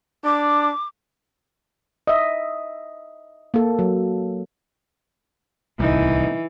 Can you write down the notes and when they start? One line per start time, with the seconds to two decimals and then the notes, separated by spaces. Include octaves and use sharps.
0.25 D4 D6
2.07 D#5 E5
3.54 A#3 A4
3.79 F#3
5.80 D1 C2 E3 D#4